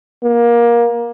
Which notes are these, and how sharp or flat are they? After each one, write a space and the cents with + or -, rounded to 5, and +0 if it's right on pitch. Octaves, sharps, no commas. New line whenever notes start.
A#3 +20